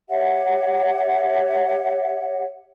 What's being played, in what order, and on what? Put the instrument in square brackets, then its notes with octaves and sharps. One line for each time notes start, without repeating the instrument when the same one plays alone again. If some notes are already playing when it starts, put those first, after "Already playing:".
[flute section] G4 C#5 E5 F#5